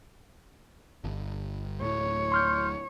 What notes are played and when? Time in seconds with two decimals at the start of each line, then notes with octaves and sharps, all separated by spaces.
1.04 G1
1.82 D1 A2 C#5
2.32 C6 F6 G6